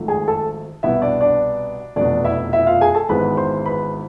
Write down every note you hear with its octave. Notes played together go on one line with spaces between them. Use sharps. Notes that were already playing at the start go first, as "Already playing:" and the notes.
Already playing: G#1 G#2 F3 A3
G#4 G#5
A4 A5
C2 B2 B3 E4 E5
D4 D5
D4 D5
F1 E2 B2 D4 D5
E4 E5
E4 E5
F4 F5
G#4 G#5
A4 A5
G#1 G#2 E3 G#3 B3 B4 B5
C5 C6
B4 B5